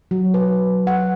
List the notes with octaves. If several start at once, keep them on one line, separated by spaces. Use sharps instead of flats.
F#3
B4
F#5